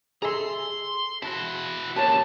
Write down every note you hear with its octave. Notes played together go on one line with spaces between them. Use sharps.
G#4 A4 E5 A#5 C6
E4 F#4 A5
A#2 C#3 G4 C#5 A5